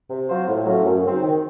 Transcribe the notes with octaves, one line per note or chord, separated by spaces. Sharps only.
C3
F#3 C4 F4 C5
A2
F#3 A3 C#4 F4
F#2
C#3 F#3 C4 D#4
D#3